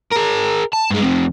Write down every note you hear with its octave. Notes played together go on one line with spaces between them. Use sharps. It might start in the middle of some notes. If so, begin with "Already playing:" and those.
G#4 A#4
A5
G2 G#3
F2 C3